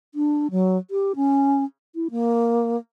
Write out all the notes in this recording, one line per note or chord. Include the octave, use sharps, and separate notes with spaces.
D4
F#3
G4
C#4
E4
A#3